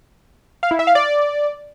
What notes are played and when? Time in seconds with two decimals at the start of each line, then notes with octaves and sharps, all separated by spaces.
0.63 F5
0.71 E4
0.79 E5
0.87 F5
0.95 D5